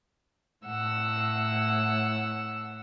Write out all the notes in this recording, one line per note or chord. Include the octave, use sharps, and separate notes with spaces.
A2 F#5 E6